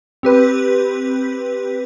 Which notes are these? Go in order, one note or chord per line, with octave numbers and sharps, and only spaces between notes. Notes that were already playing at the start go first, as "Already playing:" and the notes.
C4 G4 B4